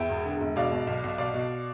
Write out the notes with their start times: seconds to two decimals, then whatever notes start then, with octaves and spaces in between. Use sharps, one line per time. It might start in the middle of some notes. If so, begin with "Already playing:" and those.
Already playing: E2 E5 G5
0.09 E1
0.26 D3
0.41 E1
0.56 B2 D5 F5
0.72 B2
0.87 B1
1.03 B1
1.18 B2 D5 F5
1.34 B2